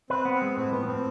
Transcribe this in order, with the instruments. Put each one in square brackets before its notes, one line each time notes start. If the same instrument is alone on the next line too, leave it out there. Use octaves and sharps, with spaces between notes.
[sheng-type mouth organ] C4 [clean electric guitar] B4
[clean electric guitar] B3
[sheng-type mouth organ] C4
[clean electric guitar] G#3
[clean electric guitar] A2 [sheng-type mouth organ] C4
[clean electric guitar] F3 [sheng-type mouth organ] B3
[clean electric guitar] A2 [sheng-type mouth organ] C4